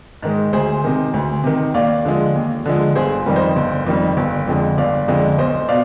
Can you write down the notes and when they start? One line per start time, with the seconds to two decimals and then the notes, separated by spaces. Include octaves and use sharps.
0.23 G#2 D#3 G#3
0.53 D2 G#4 C5
0.84 C3 D#3
1.14 D2
1.44 C3 D#3
1.74 D#2 D5 F5
2.05 D3 F3 G#3
2.35 D#2
2.65 D3 F3 G#3
2.95 G1 G#4 C5
3.26 F2 D#3 G3
3.36 C5 D#5
3.56 G1
3.86 F2 D#3 G3
4.17 G1
4.47 F2 D3 G#3
4.78 G1 D5 F5
5.08 F2 D3 G#3
5.38 B1 C5 D#5
5.69 B2 D5 F5